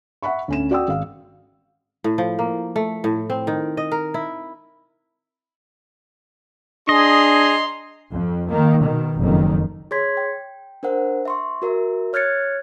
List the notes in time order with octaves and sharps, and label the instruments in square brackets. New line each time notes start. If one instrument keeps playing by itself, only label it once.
[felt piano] E5 F#5 B5 C#6
D2 C#4 E7
F#4 D5 F#5 G5 D#6 E6
G#1 F5
[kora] A2
F3
A#3
A3
A2
C4
D#3
D#5
A#4
E4
[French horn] D4 [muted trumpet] G#4 [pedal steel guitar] D#5 [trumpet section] A#5 C6
[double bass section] F2
D#3 A#3
B2 D#3
F#1 F2 D#3
[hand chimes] G#4 C#5 C6 G#6 B6
G5
D4 A#4 C5 F#5
E5 C6 C#6
F#4 A#4 E5
C#5 F6 F#6 G#6 A6 C#7